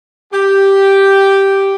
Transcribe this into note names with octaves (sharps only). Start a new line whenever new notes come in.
G4